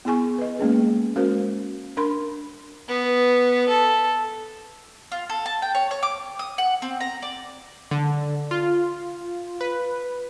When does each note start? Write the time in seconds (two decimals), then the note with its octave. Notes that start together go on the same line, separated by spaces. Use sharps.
0.05 B3 E4 G#4 G#5 C#6
0.38 B4 D#5
0.59 G#3 A#3 C#4 G#4
1.16 G#3 C#4 F#4 A#4 C5
1.97 D4 A#4 B5 C6
2.88 B3
3.69 A4
5.12 F4
5.29 A4
5.46 A5
5.62 G5
5.75 C#5
5.91 C#5
6.03 D6
6.39 D#6
6.58 F#5
6.82 C4
7.00 A#5
7.22 D5
7.91 D3
8.51 F4
9.61 B4